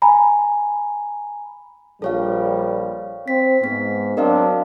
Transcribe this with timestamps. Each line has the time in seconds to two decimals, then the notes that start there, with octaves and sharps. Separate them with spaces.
0.02 G#5 A#5 B5
2.02 A#1 G3 A4 C#5 F5
3.28 C4 B6
3.63 G#2 B3 B6
4.17 F#3 C4 D4 A#4 D#5 F5